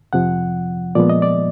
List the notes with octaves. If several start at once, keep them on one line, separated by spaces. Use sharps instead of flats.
F2 C3 F3 F#5
A#2 F3 G#3 B3 D5
D#5
D5